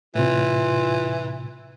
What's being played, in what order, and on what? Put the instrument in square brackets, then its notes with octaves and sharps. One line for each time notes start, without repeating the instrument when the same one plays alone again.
[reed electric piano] A2 C3 [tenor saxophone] E3 [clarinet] F4